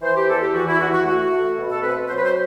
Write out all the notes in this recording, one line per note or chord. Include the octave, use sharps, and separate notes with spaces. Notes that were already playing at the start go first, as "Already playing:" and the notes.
E3 C5
G4
E2 A4
G4
E3 F#4
E4
E2 F#4
F#4
A3 F#4
A3
B2
A4
C4 B4
F#3 C5
B4
C5